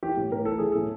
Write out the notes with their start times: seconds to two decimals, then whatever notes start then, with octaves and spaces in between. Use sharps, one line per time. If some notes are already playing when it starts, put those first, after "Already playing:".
0.03 E3 G4
0.17 A2
0.32 A2 A#4
0.45 E3 A4
0.58 E3 G#4
0.72 A2 A4